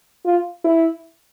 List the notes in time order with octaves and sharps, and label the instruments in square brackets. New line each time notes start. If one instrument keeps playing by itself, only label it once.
[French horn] F4
E4